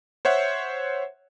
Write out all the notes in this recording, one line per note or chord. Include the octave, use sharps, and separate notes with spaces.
C5 C#5 E5 F#5